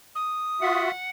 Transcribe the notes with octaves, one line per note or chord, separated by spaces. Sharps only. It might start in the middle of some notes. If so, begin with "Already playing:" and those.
D#6
F4 F#4 E5 F#5